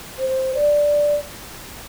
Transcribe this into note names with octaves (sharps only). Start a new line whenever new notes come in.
C5
D5